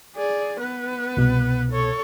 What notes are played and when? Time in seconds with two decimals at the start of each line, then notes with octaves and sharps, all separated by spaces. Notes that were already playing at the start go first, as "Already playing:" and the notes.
0.16 G#4 D5
0.60 B3 B4
1.17 C2 B2
1.71 A4 C#5